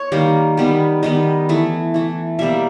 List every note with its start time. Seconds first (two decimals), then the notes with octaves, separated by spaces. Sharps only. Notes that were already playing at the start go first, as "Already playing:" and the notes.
Already playing: C#5
0.12 D#3 G3 A#3
0.57 D#3 G3 B3
1.03 D#3 G3 B3 D#5
1.49 E3 A3
1.94 E3 A3
2.39 B2 G3 A#3 E5